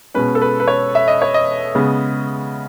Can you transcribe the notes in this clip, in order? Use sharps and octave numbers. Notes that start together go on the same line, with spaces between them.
B2 G#3 C#4 B4
A4
B4
B4
C#5
E5
D#5
C#5
D#5
C#3 G#3 B3